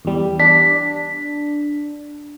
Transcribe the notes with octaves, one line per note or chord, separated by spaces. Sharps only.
E2 G3
D4 B6